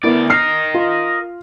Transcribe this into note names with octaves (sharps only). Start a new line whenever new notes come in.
D2 B3 E4 A#4 D5
A#4 D#5 F6 C7
F4